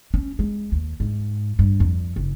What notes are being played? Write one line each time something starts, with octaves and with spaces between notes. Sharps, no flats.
C#4
G#3
D#2
G#2
G2
F2
F#1